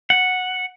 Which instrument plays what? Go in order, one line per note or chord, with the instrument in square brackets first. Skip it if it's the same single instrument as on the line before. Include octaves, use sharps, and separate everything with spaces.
[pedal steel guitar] F#5